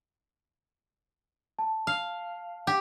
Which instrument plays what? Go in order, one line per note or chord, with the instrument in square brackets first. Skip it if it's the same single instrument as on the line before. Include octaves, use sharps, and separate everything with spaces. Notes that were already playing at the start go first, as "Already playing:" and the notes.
[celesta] A5
[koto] F5
G4